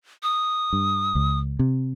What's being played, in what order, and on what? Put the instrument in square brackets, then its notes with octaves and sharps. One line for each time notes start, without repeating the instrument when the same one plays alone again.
[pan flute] D#6
[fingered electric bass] G2
C#2
C3